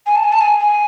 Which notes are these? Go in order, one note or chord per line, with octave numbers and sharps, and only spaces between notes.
G#5
A5
G#5
A5
G#5
G#5